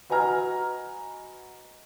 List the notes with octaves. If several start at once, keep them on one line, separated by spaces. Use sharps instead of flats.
F#4 B4 D#5 G#5 A#5 F6